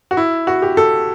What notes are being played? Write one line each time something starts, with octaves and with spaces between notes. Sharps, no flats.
F#4
E4
F#4
G4
A4